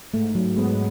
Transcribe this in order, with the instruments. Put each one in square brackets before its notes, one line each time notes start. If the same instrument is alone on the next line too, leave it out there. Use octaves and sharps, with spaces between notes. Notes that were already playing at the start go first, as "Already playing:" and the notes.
[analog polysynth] G#2 [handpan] A3
[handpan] F#3
[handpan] G#3 [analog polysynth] B3